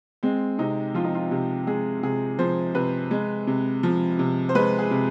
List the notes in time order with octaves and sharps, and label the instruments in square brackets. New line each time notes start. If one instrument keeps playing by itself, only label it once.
[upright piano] G#3 C4
C3 D#4
F3 F4
D#4
F4
C3 G4
G#3 G#4
C3 G#4
F3 C5
C3 B4
G#3
C3
F3
C3
C5
G#3 B4
G#4
C3